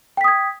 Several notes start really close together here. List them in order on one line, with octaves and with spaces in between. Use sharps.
G5 B6 D#6 G#6